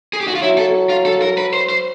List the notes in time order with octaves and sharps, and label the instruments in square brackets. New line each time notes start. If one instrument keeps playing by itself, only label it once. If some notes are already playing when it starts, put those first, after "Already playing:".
[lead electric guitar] G#4
G4
F#4
F4
[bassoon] F#3 [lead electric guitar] E4
[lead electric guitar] A4
F4
A4
A#4
B4
C5
C5